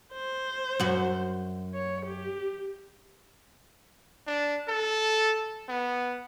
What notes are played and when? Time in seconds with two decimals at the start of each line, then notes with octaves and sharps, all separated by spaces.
0.13 C5
0.80 F#2 F#4
1.75 C#5
2.06 G4
4.27 D4
4.68 A4
5.69 B3